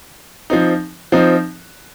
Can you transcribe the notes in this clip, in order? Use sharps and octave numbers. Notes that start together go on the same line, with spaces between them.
F3 C4 D#4
F3 C4 D#4